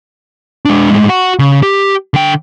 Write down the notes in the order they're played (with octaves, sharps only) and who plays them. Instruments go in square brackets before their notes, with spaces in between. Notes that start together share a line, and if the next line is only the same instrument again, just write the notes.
[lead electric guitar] G#3 D4
A2 G#3
F#4 F#5
C#3
G4
D3 G5